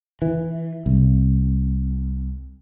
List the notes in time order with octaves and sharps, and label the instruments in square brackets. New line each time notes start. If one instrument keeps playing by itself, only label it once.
[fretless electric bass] E3
C2